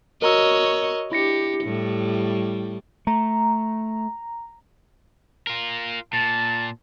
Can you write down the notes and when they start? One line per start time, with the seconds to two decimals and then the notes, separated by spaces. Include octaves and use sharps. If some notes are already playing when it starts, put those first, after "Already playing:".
0.22 F#4 A#4 C#5 D#5 A#5 E6
1.12 D4 E4 G4 A#6 C#7
1.64 A2 G3
3.07 A3 A#5
5.47 F4 A#4
6.13 A#2 A5